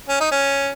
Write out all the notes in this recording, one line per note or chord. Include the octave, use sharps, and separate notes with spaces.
C#4
D#4
C#4